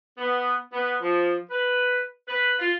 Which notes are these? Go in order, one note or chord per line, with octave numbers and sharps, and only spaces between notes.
B3
B3
F3
B4
B4
F4